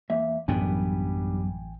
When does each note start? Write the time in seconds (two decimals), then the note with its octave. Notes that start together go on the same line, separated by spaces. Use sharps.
0.10 E2 A#3 E5
0.48 A1 F#2 F#3 G3 B3 D4 G5 G#5